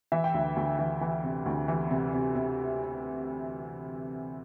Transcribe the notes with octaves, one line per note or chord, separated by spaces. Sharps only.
E3 E5
G5
D2 E5
D2
E3
E3
C3
D2
E3
C3
C3
C3